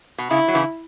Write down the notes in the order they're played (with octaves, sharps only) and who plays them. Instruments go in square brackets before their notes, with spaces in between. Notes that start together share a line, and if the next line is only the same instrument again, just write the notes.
[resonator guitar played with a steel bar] B2
[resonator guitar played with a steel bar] C#3 [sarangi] E4
[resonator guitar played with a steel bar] F#3
C#3 E3